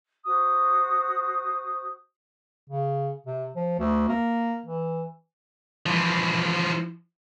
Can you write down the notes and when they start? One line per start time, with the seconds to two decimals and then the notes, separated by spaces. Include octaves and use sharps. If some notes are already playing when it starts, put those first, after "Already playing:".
0.25 F#4 C5 D#6
2.69 C#3
3.26 C3
3.56 F3
3.79 D2
4.09 A#3
4.66 E3
5.86 E3 F3